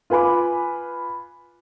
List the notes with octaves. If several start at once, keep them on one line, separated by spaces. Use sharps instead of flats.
F4 B4 G#5 B5 D6